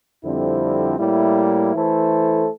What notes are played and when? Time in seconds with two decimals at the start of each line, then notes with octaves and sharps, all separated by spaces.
0.23 F2 D3 G3 C4 E4
0.98 A2 G3 A#3 E4
1.74 E3 A3 E4 A4 C5